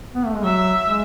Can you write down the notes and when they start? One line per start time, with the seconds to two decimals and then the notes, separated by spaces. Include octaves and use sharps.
0.15 B3
0.26 A3
0.35 G#3
0.44 F#3 E5
0.86 G#3